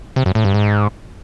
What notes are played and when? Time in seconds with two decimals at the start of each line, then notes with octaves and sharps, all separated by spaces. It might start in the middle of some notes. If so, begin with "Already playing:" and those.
0.16 C3
0.26 F#2
0.35 A2
0.45 G2
0.54 G#2